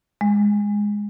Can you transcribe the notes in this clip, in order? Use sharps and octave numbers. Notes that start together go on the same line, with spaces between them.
G#3